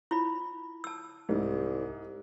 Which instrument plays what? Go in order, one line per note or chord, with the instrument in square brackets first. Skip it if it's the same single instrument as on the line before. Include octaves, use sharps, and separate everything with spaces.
[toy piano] E4 F4 B5
A5 E6
[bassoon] C2 [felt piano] G#2